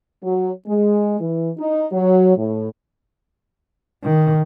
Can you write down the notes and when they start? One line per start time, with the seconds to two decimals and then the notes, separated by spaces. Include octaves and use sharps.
0.23 F#3
0.67 G#3
1.20 E3
1.58 D#4
1.92 F#3
2.36 A2
4.04 D#3